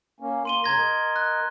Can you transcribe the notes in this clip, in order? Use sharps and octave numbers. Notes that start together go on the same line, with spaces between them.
A#3 C#4
A#3 C6 D#7 G7
G2 C#3 A#5 G#6 A#6
A#4 D#5
F#6